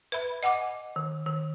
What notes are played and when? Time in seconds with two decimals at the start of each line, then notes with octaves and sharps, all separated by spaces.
0.12 B4 E5 B5
0.43 D#5 F#5 G#5 D6
0.96 D#3
1.26 D#3